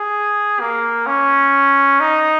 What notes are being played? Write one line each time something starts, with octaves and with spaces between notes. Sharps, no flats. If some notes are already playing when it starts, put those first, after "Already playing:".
Already playing: G#4
A#3
C#4
D#4